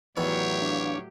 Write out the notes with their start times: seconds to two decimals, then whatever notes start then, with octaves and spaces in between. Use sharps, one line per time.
0.17 E2 A2 D#3 E3 F#3 G4 C#5
0.62 D4 F5 D6